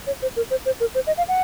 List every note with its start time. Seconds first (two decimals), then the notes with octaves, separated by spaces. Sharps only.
0.07 C#5
0.22 C5
0.36 A#4
0.50 C5
0.66 C5
0.80 A#4
0.95 C5
1.07 D#5
1.17 F5
1.28 F#5